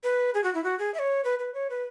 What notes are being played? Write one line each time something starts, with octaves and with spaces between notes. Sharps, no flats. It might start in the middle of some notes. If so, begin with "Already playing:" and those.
B4
G#4
F#4
E4
F#4
G#4
E5
C#5
B4
B4
C#5
B4